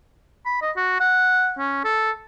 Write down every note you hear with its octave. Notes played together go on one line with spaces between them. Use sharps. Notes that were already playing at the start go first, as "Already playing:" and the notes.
B5
D#5
F#4
F#5
C#4
A4